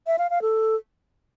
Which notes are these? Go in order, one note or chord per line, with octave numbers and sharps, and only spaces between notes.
E5
F5
F5
A4